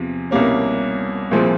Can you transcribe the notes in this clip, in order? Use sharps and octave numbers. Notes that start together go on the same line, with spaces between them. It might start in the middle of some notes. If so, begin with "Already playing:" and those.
Already playing: E2 C3 F3
C2 B2 G3 A#3 C#4
C2 A#2 F3 G#3